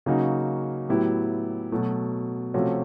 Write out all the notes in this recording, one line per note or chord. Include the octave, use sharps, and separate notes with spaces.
C#3 F#3 A#3 D#4 F#4
A2 F#3 B3 E4 G4
B2 F#3 A3
C3 F3 A3 C#4 F#4